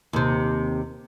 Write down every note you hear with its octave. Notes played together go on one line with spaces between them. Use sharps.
D#2 C3